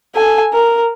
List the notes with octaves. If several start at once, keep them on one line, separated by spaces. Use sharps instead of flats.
A4 G#5
A#4